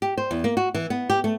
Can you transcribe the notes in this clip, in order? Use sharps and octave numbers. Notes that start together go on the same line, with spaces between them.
G4
C5
E2
A#3
F#4
E3
B3
G4
A3